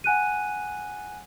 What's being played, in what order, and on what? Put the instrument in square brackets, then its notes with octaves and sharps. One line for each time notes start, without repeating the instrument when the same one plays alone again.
[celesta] F#5 G#5 F#6 D#7